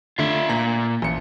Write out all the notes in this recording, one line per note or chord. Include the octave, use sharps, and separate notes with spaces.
D3 A3 F4 E5
A#2 A#5
A1 F3 C#7